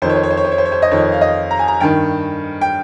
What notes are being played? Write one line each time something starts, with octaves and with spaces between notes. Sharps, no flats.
F2 D#3 C5 C#5
C5
C#5
C5
C#5
C5
C#5
C5
C#5
C5
D#5
F2 D#3 C#5
F5
D#5
A#5
G#5
A#5
G2 D#3 G5
G5